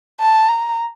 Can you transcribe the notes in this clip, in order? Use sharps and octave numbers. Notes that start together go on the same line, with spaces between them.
A5
A#5